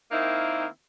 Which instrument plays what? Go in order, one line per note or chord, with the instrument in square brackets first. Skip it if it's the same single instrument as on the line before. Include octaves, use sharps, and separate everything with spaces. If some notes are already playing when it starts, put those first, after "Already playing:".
[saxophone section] D#3 A#3 C4 D#4 E4